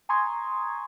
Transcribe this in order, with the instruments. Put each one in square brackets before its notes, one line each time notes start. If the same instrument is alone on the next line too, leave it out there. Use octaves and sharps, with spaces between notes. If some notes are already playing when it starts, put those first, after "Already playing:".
[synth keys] G#5 A#5 C6 C#6 D#6 G#6